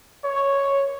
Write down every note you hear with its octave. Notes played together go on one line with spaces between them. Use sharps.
C#5